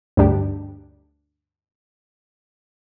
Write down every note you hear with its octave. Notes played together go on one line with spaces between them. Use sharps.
D2 G2 D4 G4